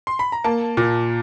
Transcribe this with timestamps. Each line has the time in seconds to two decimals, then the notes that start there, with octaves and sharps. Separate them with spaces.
0.07 C6
0.19 B5
0.32 A#5
0.44 A#3 A5
0.77 A#2